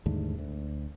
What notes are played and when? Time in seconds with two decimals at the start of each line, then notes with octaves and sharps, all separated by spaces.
0.06 D#2 G#2 D3 A3
0.39 D2